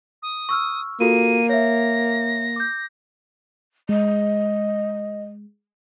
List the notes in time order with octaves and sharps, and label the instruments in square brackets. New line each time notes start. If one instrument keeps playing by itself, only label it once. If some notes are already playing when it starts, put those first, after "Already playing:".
[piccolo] D#6
[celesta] C#6 E6 F6
[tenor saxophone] A#3 [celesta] F4 F#4 A4 [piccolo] D#7
[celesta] C#5 E5 [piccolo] A#6
[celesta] D6 G6
[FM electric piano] G#3 [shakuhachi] D#5